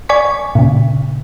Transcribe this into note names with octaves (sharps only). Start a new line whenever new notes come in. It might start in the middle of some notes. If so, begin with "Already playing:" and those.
D5 G#5 C#6 B6
A#2 C#3